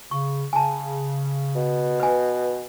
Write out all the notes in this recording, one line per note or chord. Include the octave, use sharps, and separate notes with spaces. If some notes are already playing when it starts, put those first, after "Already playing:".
C#3 C#6
C#3 G#5 A5
B2
B4 G#5